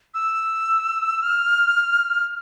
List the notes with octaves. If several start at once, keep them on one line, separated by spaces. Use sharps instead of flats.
E6
F6